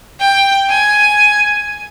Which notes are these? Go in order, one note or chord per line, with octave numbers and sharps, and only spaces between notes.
G5
G#5